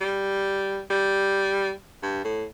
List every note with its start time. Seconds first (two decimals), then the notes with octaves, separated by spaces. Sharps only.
0.01 G3
0.91 G3
2.03 G2
2.25 A2